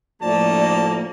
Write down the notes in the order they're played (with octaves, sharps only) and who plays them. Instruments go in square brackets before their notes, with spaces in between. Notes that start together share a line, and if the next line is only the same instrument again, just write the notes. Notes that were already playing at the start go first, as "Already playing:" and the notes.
[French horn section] D2 A2 F3 [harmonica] A3 A5 [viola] A#3 [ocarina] D5